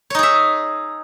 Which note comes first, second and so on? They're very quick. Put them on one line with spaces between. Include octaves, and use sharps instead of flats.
C#5 D#4 G#4 E5